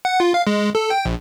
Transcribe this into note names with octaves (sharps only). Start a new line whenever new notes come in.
F#5
F4
F5
G#3
A4
G5
A#1